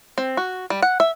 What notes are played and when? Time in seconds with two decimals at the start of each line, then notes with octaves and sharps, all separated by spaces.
0.18 C4
0.37 F#4
0.70 G3
0.82 F#5
1.00 E5